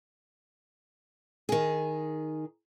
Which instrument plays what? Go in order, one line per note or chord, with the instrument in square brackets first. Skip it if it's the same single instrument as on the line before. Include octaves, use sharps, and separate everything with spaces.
[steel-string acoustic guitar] D#3 G#4